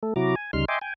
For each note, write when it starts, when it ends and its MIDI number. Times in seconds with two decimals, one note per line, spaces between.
0.03 0.14 57
0.03 0.14 69
0.16 0.35 48
0.16 0.35 54
0.16 0.35 64
0.16 0.35 66
0.16 0.35 82
0.16 0.35 86
0.36 0.51 80
0.53 0.65 38
0.53 0.65 49
0.53 0.65 55
0.53 0.65 63
0.53 0.65 84
0.53 0.65 89
0.68 0.79 75
0.68 0.79 76
0.68 0.79 79
0.68 0.79 80
0.68 0.79 84
0.68 0.79 86
0.81 0.94 79
0.81 0.94 80